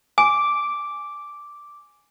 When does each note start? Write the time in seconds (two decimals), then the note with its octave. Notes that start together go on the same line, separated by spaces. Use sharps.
0.18 G#5 D6